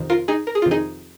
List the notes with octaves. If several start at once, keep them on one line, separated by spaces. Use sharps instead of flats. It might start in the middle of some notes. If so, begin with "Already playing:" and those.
Already playing: F2 C3 D#3
F4 A#4
D#4 G#4
A#4
G#4
F2 C3 D#3 F4
D#4 G#4